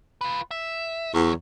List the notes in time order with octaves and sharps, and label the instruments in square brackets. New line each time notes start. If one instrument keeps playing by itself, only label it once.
[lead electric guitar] F4 B4
E5
[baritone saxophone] E2 [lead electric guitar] F#3